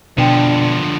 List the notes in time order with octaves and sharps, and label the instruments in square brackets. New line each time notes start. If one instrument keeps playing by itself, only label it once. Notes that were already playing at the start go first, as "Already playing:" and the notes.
[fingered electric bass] B2 [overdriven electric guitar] D3 F3 [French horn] D4 [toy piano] B4 G5